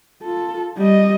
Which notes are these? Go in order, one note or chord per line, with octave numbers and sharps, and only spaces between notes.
F4 A4
G3 D#5